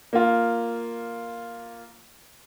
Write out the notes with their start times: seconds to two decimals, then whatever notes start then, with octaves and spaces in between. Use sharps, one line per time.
0.13 A#3 F4